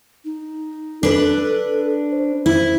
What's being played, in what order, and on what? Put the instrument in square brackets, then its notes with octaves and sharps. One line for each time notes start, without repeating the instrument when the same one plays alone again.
[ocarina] D#4
[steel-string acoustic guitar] D4 B4 [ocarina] A4
[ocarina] C5
[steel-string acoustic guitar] E4